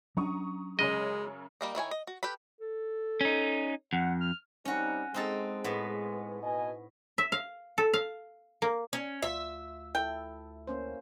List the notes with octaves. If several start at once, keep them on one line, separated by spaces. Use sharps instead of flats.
F#3 C#4 D4 A#5 C#6 D#6
F#2 C#3 G#3 C#5 D#5
G3 A#3 D#4
D#3 E4 C#5 G#5
D#5
F#4
G4 A4 B4 B5
A4
C#4 D#4
F2 F#5
F6
G3 C4 C#4 D#4 F#4
G#3 C4 D#4 A4
A2 B3
B2 D#5 G#5
E5
F5
A4
F5
A#3
C#4
D2 F4 E5
E4 A4 G5
A#3 C#4 C5